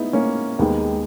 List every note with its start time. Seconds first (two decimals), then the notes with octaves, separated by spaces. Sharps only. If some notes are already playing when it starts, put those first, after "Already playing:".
Already playing: B3 D#4 E4
0.13 A#3 C#4
0.59 D#2 D#3 G#3 B3
0.89 G#3